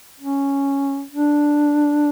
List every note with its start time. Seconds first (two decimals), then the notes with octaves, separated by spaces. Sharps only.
0.20 C#4
1.12 D4